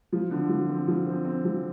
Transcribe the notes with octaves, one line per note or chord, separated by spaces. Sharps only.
F3
D3
F3
C4
F3
C4
C4
F3